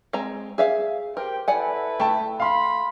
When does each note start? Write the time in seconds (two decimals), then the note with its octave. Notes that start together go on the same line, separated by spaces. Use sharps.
0.13 G#3 C4 A#5
0.58 G#4 E5 F5
1.17 G4 A#4 C5 G5
1.48 E4 A4 B4 D5 F#5 G#5
2.00 A3 G5 A5
2.40 F5 B5 C6